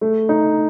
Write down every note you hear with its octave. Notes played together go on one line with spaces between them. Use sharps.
A3
D#4